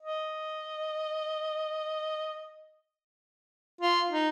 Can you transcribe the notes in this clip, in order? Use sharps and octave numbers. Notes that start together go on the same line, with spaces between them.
D#5
F4
D#4